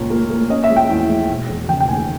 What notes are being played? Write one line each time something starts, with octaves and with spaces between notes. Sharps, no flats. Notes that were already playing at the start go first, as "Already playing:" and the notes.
Already playing: C#2 A#2 C#4
A#3
A#3
C#4 D#5
E5
G#3
G5
E2
G#3
E1
E1
C#3 G5
G5
D#2 G#5